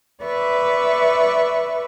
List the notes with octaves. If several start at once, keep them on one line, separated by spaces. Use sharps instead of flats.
B4 D5 E5 C#6